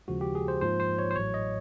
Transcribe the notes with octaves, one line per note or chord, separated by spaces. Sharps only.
D#2 C#3 F3 G#3 F#4
G4
G#4
C5
G#2 F3 A#3 C5
C5
C#5
C5
A1 A2 F#3 C#5
D#5